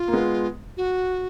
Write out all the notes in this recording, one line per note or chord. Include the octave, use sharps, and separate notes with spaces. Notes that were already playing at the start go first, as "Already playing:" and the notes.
Already playing: F4
A#3
G#3 B3
F#4